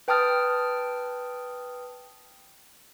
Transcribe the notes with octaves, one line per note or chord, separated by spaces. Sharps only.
B4 G5 A5 D#6 F6 A6